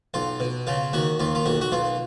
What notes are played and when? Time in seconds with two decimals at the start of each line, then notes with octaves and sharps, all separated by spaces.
0.14 B1 F4
0.40 B2
0.67 C#3 F4
0.93 D#2 F#4
1.20 D#2 F4
1.35 F4
1.46 B1 F#4
1.61 F#4
1.72 B1 F4